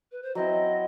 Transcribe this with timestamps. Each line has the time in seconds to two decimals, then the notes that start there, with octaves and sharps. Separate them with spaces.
0.12 B4
0.23 C5
0.35 F#3 C4 E4 D#5